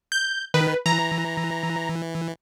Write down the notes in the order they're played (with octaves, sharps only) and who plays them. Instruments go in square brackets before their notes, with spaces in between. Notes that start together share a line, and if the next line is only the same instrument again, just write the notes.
[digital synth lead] G6
[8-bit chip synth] D#3 [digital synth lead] B4
[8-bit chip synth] E3 [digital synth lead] A#5